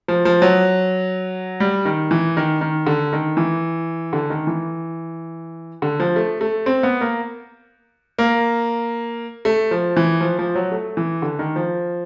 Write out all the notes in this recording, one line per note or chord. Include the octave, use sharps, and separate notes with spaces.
F3
F3
F#3
G3
D#3
E3
D#3
D#3
D3
D#3
E3
D3
D#3
E3
D3
F3
A3
A3
C4
B3
A#3
A#3
A3
F3
E3
F3
F3
F#3
A3
E3
D3
D#3
F3